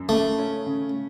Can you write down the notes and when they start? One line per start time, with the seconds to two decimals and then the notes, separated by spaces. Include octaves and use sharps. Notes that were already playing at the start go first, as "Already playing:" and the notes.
Already playing: F#2
0.09 C#3 A3
0.39 C#4
0.66 C#3